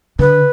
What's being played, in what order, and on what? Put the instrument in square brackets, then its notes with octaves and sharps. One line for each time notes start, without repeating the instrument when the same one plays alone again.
[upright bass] D3 [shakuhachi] B4